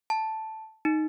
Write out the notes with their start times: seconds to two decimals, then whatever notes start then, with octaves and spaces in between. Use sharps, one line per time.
0.10 A5
0.85 D#4